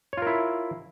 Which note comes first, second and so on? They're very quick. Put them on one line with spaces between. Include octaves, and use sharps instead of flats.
C#5 F4 A#4 E4